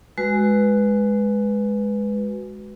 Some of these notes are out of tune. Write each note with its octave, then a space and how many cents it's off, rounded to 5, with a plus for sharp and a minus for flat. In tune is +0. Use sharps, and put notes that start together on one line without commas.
G#3 +5 F#4 +5 B4 +0